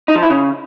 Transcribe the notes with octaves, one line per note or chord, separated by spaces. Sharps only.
D#4
F3
E4
C#3